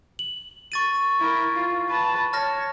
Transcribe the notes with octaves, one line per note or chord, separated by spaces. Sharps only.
F#7
C#6 A6 D#7
E4 A#4
F4
B4 A5
C#5 A5 F6 A#6